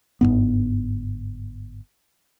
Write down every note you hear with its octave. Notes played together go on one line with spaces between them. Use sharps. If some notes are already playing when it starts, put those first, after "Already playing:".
G1 F2 G#2 B3